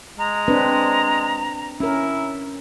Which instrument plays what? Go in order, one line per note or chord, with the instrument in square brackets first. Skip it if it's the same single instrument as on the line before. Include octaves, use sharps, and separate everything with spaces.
[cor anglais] G#3 [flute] A#5
[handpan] C4 D4 B4
[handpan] C#4 A#4 [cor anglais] E4